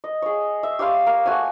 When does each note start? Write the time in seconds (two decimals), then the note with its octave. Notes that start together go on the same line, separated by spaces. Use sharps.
0.04 D#5
0.22 G#4 C#5
0.63 E5
0.79 G4 C#5 F5 C6
1.07 A#3
1.26 A3 F#4 C#5 G#5